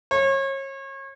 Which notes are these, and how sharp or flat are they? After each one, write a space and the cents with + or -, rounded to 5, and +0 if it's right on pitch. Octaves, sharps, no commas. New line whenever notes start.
C#5 -35